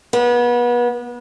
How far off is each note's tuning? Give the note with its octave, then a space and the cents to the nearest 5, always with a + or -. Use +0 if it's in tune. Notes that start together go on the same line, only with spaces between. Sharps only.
B3 -30